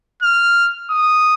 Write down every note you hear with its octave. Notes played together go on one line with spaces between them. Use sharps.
F6
D#6